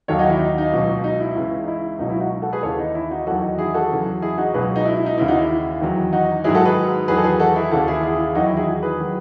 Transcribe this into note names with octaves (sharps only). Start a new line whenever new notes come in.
D#2 D#3 F#3 A4 C#5
D#4 F#4
E4
D#4
D#4
C#2 B2 F#3
D#4
E4
C#2 C#3 E3
D#4
E4
C#2 B2 F#3 D#4
E4
D#4 F#4
F#4 A4
G#4 B4
D#2 C#3 E3 A4 C#5
D#4
E4
D#4 F#4
E2 D#3 F#3 F#4 A4
D#4 F#4
E4 G#4
F#4 A4
E2 C#3 F#3
E4 G#4
D#4 F#4
C#2 B2 F#3 G#4 B4
D#4
E4
E4
D#4
D#2 C#3 E3 E4
D#4 F#4
E4
E2 D#3 F#3
D#4 F#4
G#2 D#3 F#3 E4 G#4
F#4 A4
G#4 B4
E2 D#3 F#3 G#4 B4
A4
G#4 B4
F#4 A4
E4 G#4
D#2 C#3 E3 F#4 A4
E4 G#4
E4 G#4
E2 D#3 F#3 D#4 F#4
E4
E4 G#4
G#4 B4
D#3 F#3